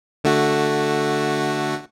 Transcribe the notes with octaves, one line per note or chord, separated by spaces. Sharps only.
D3 A3 F#4